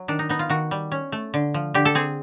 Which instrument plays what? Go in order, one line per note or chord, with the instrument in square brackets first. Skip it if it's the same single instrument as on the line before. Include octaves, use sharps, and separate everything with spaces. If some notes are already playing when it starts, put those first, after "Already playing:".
Already playing: [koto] F#3
D#3 D4
D#4
B3 D#4
F4
D#3 F#4
G3
C#4
A3
D3
F3
D3 G4
A4
C4 G#4